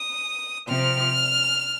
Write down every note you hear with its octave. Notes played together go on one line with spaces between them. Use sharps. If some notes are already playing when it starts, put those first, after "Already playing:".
Already playing: D#6
C3 F3 C4 F6